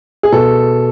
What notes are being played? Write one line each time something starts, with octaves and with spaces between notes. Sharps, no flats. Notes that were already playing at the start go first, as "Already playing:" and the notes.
G#4
B2 A4